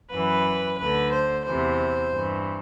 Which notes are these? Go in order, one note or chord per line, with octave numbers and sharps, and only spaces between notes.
F#2 E3 B4
D2 D3 B4
C5
E2 C3 E3 C5
G2 E3